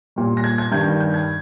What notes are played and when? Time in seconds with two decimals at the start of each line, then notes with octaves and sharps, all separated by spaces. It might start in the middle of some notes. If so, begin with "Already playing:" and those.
0.16 A#2 G3
0.37 A#6
0.44 G#6
0.58 G#6
0.72 G2 D#3 G3 G6
1.00 G6
1.14 G#6